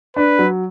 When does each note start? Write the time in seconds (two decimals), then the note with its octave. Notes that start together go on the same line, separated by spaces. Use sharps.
0.16 D4 B4
0.39 F#3